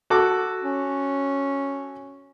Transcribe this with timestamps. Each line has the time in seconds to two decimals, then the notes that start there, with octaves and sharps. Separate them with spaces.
0.10 F#4 A4 D6
0.63 C#4